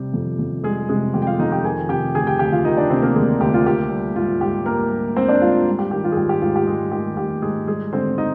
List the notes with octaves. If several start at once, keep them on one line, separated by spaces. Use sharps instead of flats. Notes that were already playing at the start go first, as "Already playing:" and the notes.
Already playing: C3 G3 G4
F2
F2
G3 G#3 G#4
C3 G#3 G#4
F2 G4
G5
F4 F5
F2 D#4 D#5
G4 G5
D#3 G#4 G#5
C3 G4 G5
D2 G#4 G#5
G4 G5
D2 G4 G5
F4 F5
D#3 D#4 D#5
D4 D5
C3 C4 C5
A#3 A#4
D2 G#3 G#4
D2 G4
F4
A#3 G4
G3
G#2 F4
G#2 G4
A#3 A#4
G3
G#2 C4 C5
D4 D5
G#2 F4 F5
G3
G4
D#3 G4
F4
G#4
G#2 G4
G4
G#2 F4
G4
G3 G#3 G#4
D#3 G4
G#2 G4
G#2 G#3 G#4
G3 G#3 G#4
D3 C4 C5
D#4 D#5